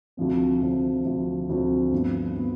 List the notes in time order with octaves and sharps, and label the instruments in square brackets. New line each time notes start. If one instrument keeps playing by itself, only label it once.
[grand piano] D2 C3 F3 C4
D2 C3 F3 C4
D2 C3 F3 C4
D2 C3 F3 C4
G2 F3 B3
F3 B3